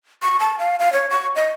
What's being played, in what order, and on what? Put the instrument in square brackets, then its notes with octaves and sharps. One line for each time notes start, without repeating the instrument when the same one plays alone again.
[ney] C#6
A5
F5
F5
C#5
C#6
D#5